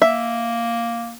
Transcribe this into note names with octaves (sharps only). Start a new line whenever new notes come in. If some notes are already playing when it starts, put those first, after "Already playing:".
A#3 E5